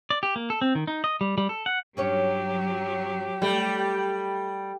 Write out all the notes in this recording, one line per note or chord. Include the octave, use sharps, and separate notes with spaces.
D5
G4
A#3
A4
C4
D#3
D#4
D#5
G3
G3
A4
F#5
G2 F#3 C#4 G4 C#5
G3 A3